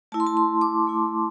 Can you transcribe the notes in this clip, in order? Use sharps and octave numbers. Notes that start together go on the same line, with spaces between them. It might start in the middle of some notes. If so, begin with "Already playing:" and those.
A3 E4 A5
C6
A5
C6
D6
A3 E4